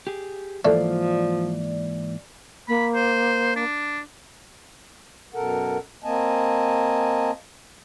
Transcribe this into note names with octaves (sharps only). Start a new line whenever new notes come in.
G4 G#4
G#2 E3 F3 A3 A#3 D5
A#3 B5
C5
D4
F#2 B2 A4 A#4 F#5
A#3 C4 D#5 G#5 A5